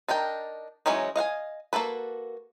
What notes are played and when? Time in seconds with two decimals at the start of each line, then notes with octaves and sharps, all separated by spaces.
0.08 D4 D#4 A#4 G5
0.86 E3 F#3 G#3 C#4 D#4
1.16 D#5 F5 F#5 G#5
1.73 A#3 F#4 A4 B4